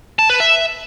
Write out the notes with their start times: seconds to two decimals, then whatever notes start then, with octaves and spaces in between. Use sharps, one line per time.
0.19 A5
0.30 B4
0.40 E5